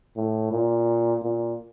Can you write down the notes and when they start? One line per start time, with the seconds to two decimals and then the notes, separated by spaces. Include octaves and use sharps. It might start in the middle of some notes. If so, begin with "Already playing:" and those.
0.16 A2
0.52 A#2
1.23 A#2